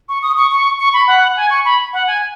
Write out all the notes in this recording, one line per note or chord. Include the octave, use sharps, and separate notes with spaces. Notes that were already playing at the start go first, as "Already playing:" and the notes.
C#6
D#6
C#6
C#6
C#6
B5
F#5
G#5
C#6
B5
F#5
G#5